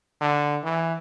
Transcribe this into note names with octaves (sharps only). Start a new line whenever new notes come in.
D3
E3